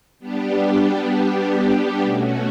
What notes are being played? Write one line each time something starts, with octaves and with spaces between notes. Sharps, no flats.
G3 B3 D4 G4
B2 A3 C#4 F#4